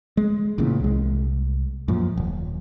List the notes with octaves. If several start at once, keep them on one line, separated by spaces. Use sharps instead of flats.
G#3
A1 A#2 C#3 E3
C2 G#3
F#2 A#2 F3
D#1